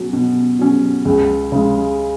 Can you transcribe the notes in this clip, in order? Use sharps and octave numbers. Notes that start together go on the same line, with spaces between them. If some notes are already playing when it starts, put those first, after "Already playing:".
Already playing: B2 F#3 C#4
B2
F#3 C#4
C#2
C#3 G#3